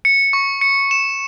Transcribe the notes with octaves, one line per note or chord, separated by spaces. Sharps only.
C#7
C#6
C#7
E7